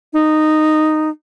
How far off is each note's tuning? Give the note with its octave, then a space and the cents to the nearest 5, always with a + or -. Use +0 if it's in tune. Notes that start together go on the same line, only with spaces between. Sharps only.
D#4 -10